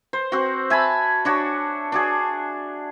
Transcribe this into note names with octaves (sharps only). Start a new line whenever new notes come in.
C5
C4 F#4
E5 G#5 A5 B5
D4 F#4 C#5
D4 F#4 G#4